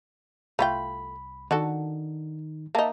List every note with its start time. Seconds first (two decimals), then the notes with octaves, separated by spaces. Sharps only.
0.59 C2 A3 F4 G5 B5
1.51 D3 D#3 D#4 F#4 A4
2.75 A#3 D#4 E5 A5